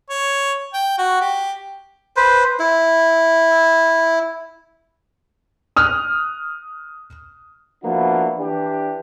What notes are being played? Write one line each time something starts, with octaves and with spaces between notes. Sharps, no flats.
C#5
G5
F#4
G4
B4 C5
E4
D#6 F6 F#6
F3 A#3 B3 D4 E4 F#4
E3 D4 G4